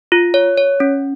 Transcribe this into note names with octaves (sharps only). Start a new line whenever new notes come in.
F4
C#5
C#5
C#4